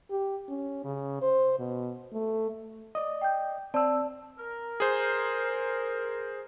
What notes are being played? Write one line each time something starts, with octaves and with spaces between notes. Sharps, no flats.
G4
C#4
C#3
C5
B2
A3
D5 D#5
G5 G6
C4 D5 A5 E6
A#4
G#4 C5